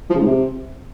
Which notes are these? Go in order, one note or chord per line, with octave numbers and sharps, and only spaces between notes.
F3
C#3
G#2
C3